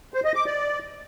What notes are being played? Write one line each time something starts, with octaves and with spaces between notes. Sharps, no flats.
C5
D#5
D6
D5